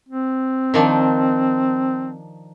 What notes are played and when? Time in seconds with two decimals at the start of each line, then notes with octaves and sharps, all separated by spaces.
0.09 C4
0.74 D#3 F3 D4